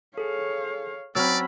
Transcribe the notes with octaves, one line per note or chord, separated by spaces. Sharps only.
G#4 A4 C#5 F5
F#3 C4 C#4 D5 B5 E6 F6